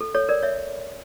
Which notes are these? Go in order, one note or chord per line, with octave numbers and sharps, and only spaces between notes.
A4
A4 C#5
A#4 D5
C#5 E5